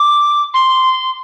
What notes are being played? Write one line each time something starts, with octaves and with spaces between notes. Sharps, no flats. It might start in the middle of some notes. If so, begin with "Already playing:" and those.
Already playing: D6
C6